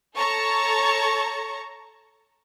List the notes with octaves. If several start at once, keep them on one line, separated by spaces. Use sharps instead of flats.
A4 C#5 A5 A#5 C#6